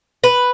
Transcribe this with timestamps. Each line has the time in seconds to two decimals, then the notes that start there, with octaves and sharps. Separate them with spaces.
0.24 B4